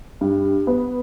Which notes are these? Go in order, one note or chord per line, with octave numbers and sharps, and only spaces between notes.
G2
B3